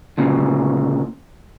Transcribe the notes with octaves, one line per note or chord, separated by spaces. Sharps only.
D2 A#2 C#3